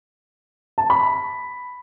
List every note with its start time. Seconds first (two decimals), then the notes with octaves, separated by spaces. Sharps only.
0.78 A5
0.90 B5